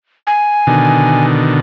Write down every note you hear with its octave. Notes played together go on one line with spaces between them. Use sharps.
G#5
B2 D3 D#3